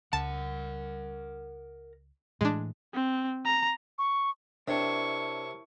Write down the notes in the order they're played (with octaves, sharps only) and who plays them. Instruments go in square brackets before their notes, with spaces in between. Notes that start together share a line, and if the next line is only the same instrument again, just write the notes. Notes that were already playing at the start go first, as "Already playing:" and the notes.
[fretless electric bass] C#2 [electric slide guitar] A#4 F#5 [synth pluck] A5
[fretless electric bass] A2 E3 [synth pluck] G#3 D4
[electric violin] C4
A#5
[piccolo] C#6
[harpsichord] C3 [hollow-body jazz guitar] D4 [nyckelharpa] E4 C#6 [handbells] A#4 C#5 A5